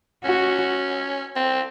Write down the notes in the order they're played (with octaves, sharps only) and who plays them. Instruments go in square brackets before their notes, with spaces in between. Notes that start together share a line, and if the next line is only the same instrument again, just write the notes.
[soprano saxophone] C#4 [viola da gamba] F#4
[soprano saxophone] C4